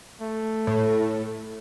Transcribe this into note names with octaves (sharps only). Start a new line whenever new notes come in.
A3
A2